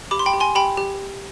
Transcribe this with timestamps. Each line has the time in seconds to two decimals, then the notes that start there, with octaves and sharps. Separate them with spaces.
0.11 G4 B5 D6
0.19 C6
0.26 G5 B5
0.33 G4
0.40 G#5 C6
0.55 G4 G5 B5
0.77 G4